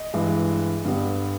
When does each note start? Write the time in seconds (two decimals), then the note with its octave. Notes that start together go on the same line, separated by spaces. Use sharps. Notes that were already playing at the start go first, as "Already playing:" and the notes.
Already playing: D#5
0.14 G2 E3 G#3
0.85 G2 D3 G3 B3